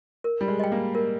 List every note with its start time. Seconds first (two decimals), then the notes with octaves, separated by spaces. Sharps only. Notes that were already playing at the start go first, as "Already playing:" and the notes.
0.24 A#4
0.41 G3
0.48 G#3
0.60 D#5 G5
0.72 A#3
0.95 A#4